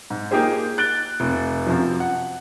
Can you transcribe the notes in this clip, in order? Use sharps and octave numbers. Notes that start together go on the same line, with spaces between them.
G#2
A#3 D#4 F4 G4 G#4 C5
F#6 A6 D7 G7
F1
F#2 C3 F3
F#5